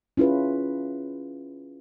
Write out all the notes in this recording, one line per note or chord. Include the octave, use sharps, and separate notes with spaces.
C#4 E4 F4 G#4 B4